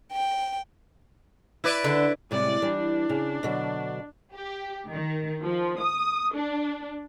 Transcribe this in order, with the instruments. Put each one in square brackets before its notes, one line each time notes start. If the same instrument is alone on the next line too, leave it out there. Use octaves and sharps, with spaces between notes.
[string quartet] G5
[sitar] E4 B4 D5
[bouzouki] D3
[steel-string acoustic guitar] A2 C3 G3 [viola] G#3 D5
[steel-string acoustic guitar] E3 G3 [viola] D4
[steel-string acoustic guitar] C#3
B2 D3 F#3
[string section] G4
D#3
F3
D#6
D4